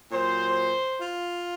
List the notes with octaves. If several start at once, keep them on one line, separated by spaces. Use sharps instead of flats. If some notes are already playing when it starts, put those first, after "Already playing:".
A#2 F#3 C5
F4